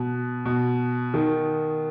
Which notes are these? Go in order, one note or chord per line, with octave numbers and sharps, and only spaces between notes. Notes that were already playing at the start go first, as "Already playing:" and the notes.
Already playing: B2
B2
D#3